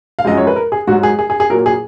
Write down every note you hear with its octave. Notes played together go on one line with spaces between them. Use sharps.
F5
F#2 F3 G#3 D#5
C#5
B4
A#4
G#4
G#2 F#3 F#4
G#4
G#4
G#4
G#4
A#2 F#3 A#4
G#4